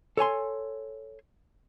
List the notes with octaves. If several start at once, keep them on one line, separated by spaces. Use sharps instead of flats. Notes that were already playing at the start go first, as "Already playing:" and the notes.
A4 C#5 G#5 C6